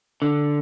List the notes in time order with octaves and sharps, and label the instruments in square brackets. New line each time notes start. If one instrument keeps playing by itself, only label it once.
[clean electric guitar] D3